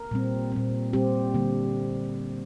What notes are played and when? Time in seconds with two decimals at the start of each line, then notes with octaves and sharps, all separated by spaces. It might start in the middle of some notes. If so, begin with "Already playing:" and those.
Already playing: A#4
0.11 A#2 G3 C4
0.52 A#2 G3 C4
0.93 A#2 G3 C4 G4
1.34 D3 G3 A#3